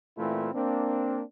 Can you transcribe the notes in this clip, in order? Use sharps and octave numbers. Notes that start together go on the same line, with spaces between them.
A#2 E3 A3 C4 E4 F4
A#3 C4 D4